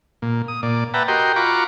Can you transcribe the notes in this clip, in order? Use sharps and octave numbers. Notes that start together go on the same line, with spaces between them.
A#2
D#6
A#2 D5
B4 E5 F#5 G5 A5 A#5
F#4 G4 A#4 D#5 G5 C6
F4 F#4 A#5 B5 C#6 D6